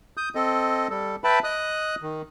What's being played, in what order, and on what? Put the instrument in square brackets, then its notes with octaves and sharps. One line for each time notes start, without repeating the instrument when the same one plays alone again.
[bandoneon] D#6 G6
C4 A4 D#5
G3 A4
B4 E5 G5 A5 B5
D#5 D#6 F#6
D#3